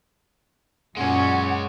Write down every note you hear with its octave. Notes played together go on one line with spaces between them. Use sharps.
F#2 A#2 G#3 C#4 C#5 F#5